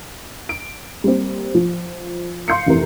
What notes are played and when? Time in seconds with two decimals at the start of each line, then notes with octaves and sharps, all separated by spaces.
0.49 D7
1.04 G3 A#3 C4
1.55 F3
2.48 F5 C6 G6 C7 C#7
2.66 F1 C3 E3 A#4